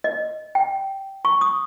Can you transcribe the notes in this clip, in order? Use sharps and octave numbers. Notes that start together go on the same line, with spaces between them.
D#5
G5
C#6
D#6